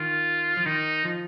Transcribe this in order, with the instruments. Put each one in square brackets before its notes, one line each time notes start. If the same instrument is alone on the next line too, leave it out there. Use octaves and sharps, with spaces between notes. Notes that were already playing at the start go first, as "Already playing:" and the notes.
Already playing: [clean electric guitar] D#3 [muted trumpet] F4
[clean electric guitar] F3
[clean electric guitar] D#3 [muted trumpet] D#4
[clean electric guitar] F3